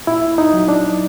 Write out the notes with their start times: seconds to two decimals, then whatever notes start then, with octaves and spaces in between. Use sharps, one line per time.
0.07 A#2 E4
0.38 D#4
0.54 F#3
0.68 D4